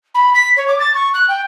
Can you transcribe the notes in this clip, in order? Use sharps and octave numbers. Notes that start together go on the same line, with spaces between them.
B5
B6
C#5
D6
A6
C#6
F#6
G5